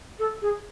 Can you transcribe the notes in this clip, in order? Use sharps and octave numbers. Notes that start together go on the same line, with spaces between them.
A4
G#4